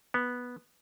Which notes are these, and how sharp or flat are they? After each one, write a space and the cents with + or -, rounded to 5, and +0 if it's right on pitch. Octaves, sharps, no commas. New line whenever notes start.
B3 -5